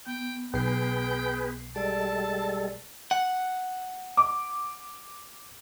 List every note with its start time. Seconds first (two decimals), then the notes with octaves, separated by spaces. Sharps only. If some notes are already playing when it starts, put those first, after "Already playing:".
0.07 B3 G5
0.54 B1 G#4 B4 G5 C7
1.76 G3 G#3 A4 D5 A5
3.11 F#5
4.17 D6